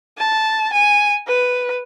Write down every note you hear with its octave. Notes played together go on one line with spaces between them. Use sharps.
A5
G#5
B4